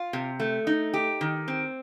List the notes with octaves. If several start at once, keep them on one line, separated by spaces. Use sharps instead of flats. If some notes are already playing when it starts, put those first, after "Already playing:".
Already playing: F4
C3
A3
D#4
G4
D#3
C4